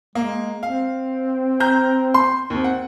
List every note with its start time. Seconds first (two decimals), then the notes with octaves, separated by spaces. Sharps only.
0.15 G#3 A#3
0.63 C4 F5
1.60 A#5 F6 G6
2.14 C6
2.50 D#2 C4
2.64 F#5